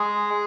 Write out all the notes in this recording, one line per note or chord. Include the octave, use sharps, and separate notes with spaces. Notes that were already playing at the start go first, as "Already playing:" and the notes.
Already playing: G#3 G#4